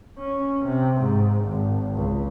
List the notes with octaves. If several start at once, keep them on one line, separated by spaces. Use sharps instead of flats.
C#4
C3
G#2
G#1
C#2